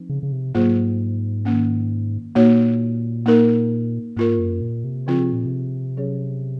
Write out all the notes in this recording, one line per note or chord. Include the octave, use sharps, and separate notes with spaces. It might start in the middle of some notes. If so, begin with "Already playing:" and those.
Already playing: F3 C4 D#4
C#3
C#3
C3
G#2 F#3 A#3 F4 G#4 C5
D#3 A#3 C#4
A#2 A#3 D#4 F#4 C#5
A#3 D#4 A#4
G#2 A#3 F4 A#4
F#2
A#2
C3
C#3 F3 C4 F4 G#4
C3
A#2
C3
F#3 C#4 G#4 C#5